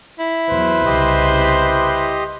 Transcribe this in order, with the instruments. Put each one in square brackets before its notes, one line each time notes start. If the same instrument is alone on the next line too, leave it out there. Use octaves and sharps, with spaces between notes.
[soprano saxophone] E4
[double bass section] E2 F#3 [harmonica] B4 C5
[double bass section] C2 C#3 [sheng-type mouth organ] G4 D#5 C6